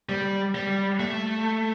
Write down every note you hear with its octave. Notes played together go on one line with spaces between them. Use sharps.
G3
G3
A3